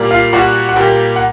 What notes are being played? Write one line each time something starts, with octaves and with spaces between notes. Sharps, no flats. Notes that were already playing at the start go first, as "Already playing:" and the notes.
Already playing: A#2 G3 A#3
F4 F5
A#2 G3 A#3 F#4 F#5
F#5
A#2 G3 A#3 G4 G5
F#5